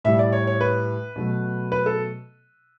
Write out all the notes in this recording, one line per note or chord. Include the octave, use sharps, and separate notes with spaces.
A2 G3 E5
D5
C#5
C#5
B4
B2 F#3 A3
B4
A4